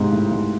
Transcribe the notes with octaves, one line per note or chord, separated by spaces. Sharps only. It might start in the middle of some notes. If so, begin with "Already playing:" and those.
Already playing: G#2 C3
A2
G#2